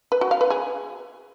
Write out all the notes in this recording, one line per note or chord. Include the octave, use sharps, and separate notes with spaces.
B4
F#4
F5
B4
G#4